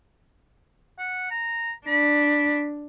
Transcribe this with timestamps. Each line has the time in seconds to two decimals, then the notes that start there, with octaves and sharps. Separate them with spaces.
0.99 F#5
1.31 A#5
1.87 D4 B5